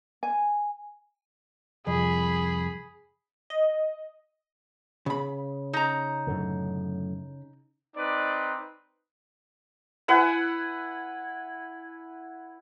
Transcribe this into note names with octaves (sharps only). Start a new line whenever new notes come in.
G#5
C2 F2 G#4 B5
D#5
C#3 B5
D#4 A#5
F#2 A2 D3
C4 D#4 B4 D5
E4 B4 F#5 G#5